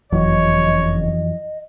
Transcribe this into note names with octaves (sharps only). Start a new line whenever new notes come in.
F#1 F2 E3 F#3 C#5 D#5